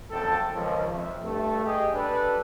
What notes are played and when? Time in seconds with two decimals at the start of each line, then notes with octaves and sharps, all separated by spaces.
0.11 F#1 F2 A4 G5 A5
0.53 C#2 D#3 F3
0.94 F2 E5
1.23 G2 A3
1.65 G4 G#4 D#5
1.94 D4 G4 A4 B4